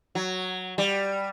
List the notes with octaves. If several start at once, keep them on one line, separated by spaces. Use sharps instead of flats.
F#3
G3